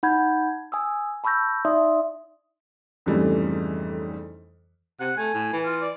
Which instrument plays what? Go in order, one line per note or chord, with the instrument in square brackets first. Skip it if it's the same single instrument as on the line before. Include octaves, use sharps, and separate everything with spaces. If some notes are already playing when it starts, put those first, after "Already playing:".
[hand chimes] D#4 F#5 B5 G6 G#6
G#5 D#6 E6
A5 B5 C#6 E6 G6 A#6
D#4 D5 E5 C6 D#6
[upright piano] F2 G#2 C#3 E3 G3 A3
[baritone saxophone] C3 [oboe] F#5
[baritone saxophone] A3 [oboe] G#5
[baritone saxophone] A2
E3
[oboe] F4
D5